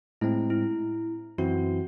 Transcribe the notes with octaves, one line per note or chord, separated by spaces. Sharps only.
A2 G#3 C4 E4
E4
F#2 E3 C4 E4 F#4